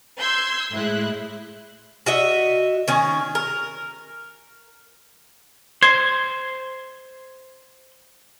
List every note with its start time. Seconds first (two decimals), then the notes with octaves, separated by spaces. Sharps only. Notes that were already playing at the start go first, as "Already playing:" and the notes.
0.18 C6 E6 G6 G#6
0.72 A2 G#3 E4 F#6
2.06 F#4 D#5 E5
2.88 D#3 C#4 G#5
3.35 A#4
5.82 C5 G#6